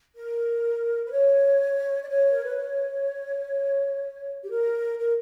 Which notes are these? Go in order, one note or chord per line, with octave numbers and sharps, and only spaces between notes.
A#4
B4
C#5
D5
C#5
A#4
B4
C#5
G4
A#4
A#4